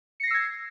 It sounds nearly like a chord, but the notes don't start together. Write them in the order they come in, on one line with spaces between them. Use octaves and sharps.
C#7 A#6 C7 E6 G#6